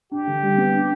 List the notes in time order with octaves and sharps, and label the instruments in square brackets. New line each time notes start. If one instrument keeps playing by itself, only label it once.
[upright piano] D4 [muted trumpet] G4
[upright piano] D3
G3
B3
D4